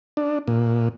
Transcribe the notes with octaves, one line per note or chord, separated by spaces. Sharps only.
D4
A#2